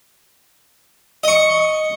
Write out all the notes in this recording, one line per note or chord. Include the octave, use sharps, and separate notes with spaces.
D#5 C#6